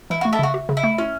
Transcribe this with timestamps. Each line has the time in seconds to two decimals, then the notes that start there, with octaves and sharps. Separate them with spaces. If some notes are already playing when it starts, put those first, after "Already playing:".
0.10 E3 E4
0.21 F#4
0.25 A3
0.33 E4 A4
0.39 C#3 F#4
0.54 F#4
0.69 C#3
0.77 E4
0.84 A3
0.98 C#4 E4